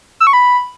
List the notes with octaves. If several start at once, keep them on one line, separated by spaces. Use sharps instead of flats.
E6
C#6
B5